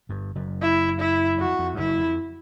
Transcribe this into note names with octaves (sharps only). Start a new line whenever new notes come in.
G1 G2
F#1 F#2
E4
E4
F2 F#4
F2
G2
F#1 F#2 E4
F2